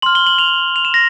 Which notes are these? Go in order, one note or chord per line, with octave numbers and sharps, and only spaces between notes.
C6 F6 F#7
G7
F#7
F7
F7
E7
A#6